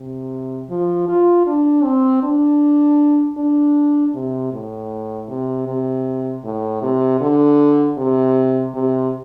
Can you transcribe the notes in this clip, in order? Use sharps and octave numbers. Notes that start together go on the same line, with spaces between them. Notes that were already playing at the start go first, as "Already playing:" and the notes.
Already playing: C3
F3
F4
D4
C4
D4
D4
C3
A2
C3
C3
A2
C3
D3
C3
C3